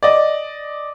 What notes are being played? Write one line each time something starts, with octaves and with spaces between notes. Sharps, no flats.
D5 D#5